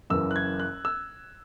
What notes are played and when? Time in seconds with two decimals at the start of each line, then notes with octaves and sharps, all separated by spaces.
0.10 F#1 F#2 E3 E6
0.31 F#6
0.36 G#6
0.60 F#6
0.85 E6